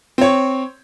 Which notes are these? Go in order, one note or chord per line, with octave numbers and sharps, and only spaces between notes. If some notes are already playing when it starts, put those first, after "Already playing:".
C4 C#5